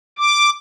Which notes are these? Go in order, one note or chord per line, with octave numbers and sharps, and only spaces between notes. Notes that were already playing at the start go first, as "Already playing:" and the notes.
D6